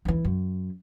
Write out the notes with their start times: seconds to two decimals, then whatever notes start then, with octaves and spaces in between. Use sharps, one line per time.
0.05 D#2 E3
0.25 F#2